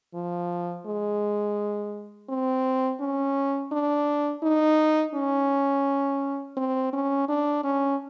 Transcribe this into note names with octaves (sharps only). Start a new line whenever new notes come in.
F3
G#3
C4
C#4
D4
D#4
C#4
C4
C#4
D4
C#4